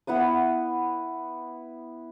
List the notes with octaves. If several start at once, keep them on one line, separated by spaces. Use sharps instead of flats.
B3 E4 F#5 D#6